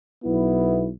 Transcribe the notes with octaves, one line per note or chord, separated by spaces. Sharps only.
B1 B3 E4